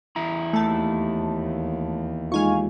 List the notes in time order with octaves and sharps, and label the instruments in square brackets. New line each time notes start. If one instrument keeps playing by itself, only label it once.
[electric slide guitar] E2 E4 A#5
[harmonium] D#2 [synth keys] A3 A5
[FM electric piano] G#3 D#4 F4 [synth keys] F5 G#5 C#6